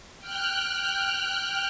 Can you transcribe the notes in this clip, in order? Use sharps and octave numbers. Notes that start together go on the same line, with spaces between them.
G5 F6 F#6